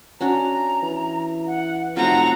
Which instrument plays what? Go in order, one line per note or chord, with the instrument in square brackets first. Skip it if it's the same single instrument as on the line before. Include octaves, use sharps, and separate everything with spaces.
[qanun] C#4 D4 F#4 [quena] A#5
[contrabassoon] E3
[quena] F#5
[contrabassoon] F1 [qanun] F#3 A3 F4 [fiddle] C4 A#5 [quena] F#5